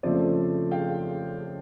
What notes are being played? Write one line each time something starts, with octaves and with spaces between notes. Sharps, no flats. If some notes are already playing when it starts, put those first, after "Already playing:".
F2 C#3 F3 A3 C5 D5
F5 G5